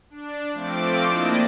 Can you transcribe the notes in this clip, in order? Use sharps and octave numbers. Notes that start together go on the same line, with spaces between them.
D4
F3 A3 C4 D6 D7
A#3 D4 E4 D#5 A5